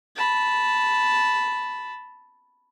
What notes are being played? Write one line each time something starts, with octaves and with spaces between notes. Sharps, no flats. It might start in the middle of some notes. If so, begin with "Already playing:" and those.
A5 B5